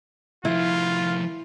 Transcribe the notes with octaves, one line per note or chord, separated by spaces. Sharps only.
C2 F3 E4 F4